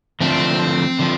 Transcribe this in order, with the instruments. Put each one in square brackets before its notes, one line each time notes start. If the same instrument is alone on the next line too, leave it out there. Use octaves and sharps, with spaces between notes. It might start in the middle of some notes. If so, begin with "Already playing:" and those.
[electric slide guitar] D3 F3 A3 [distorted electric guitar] C4
[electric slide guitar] D3 F3